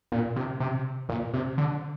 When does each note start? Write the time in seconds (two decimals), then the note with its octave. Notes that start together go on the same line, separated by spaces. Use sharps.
0.12 A#2
0.36 C3
0.60 C3
1.09 A#2
1.34 C3
1.58 D3